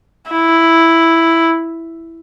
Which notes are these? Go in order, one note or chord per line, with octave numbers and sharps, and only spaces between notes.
E4